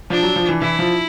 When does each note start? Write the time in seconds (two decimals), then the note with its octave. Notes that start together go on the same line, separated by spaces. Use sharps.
0.10 F3 D4
0.23 F#3
0.36 F3
0.48 E3
0.61 E3 E4
0.79 F3